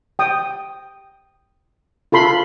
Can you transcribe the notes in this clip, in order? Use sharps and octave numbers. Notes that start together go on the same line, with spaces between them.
G5 D#6
F4 A4 B5 C6